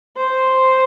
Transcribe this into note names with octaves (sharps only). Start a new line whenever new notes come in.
C5